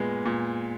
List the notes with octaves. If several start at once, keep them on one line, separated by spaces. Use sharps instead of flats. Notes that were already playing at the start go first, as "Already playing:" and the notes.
Already playing: A#2 G#3 B3
A#2